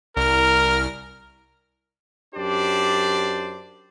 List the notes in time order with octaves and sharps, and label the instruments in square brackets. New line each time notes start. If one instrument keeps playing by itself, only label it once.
[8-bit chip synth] C2 F6 [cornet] A#4
[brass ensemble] F#2 D4 G4 C5 D5